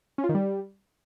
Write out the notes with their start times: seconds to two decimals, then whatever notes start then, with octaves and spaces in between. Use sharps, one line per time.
0.18 C#4
0.24 F4
0.29 D#3
0.35 G3